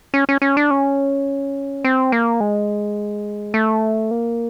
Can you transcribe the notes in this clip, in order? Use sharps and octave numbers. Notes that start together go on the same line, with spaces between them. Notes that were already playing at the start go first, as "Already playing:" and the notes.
C#4
C#4
C#4
D4
C#4
C4
A#3
G#3
A3
A#3